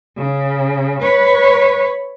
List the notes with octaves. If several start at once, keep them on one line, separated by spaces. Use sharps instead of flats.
C#3
B4 C#5